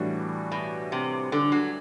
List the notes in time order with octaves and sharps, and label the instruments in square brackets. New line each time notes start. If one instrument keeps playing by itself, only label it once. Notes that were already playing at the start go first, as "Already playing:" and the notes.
Already playing: [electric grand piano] A2 E3 G3 D4 F#4
[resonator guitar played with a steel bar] B2
C3
D3
F#3